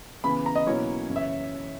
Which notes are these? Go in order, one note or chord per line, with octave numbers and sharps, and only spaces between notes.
C#3 E3 B3 B5
A#5
D#5
B2 F#3 A#3 C#4 E4 C#5
F#2 C#3 E3
E5